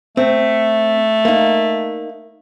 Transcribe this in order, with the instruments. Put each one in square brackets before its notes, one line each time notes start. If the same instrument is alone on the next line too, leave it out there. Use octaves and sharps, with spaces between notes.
[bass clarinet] A3 [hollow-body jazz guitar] C4
[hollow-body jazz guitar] A#3 D#4